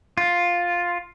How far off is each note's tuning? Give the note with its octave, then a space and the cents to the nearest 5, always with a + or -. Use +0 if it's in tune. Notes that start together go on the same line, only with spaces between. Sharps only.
F4 +5